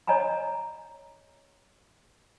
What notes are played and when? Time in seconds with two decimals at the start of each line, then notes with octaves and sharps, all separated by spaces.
0.07 C#5 D#5 G#5 A#5 B5